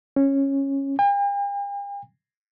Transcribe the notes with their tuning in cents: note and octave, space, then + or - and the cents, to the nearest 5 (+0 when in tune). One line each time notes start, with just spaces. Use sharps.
C#4 -10
G5 +45